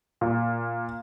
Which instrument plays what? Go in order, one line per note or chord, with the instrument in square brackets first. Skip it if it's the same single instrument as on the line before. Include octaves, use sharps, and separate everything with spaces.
[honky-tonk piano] A#2